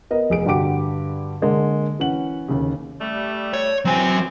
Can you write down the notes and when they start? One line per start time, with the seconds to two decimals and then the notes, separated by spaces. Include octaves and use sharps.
0.11 B3 A#4 D#5
0.30 F1 G#4 D7
0.46 G2 D3 F#4 G4 D6 D7
1.42 D3 G#3 A#3
2.00 E3 C#4 F#5 F#7
2.48 D#2 C#3
3.01 G3 A3
3.54 C#5
3.85 E3 F#3 C4 G#5